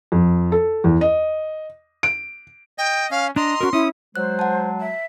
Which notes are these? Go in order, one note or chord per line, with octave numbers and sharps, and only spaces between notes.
F2
A4
E2
D#5
D7
D#5 G5
C#4 F5
D4 D#5 A#5 C6
C#4 F#4 A#4
C#4 E4 D#6
F#3 G#3 C5 F#6
F#5 A5
E5